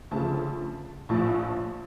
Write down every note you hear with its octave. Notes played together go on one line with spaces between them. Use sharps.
D2 C#3 F3 A5
A#1 A2 F3 A5